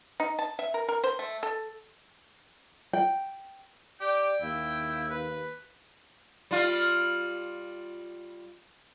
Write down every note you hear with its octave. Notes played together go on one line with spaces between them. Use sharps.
D#4
A5
E5
A#4
A#4
C5
A3
A4
G5
G4 D5 G5
D#2 E4 F5
B4
G3 F4